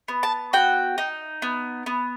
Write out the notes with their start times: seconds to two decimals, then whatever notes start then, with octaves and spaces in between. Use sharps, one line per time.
0.08 B3
0.23 A5
0.53 F#4 G5
0.98 D#4
1.42 B3
1.86 B3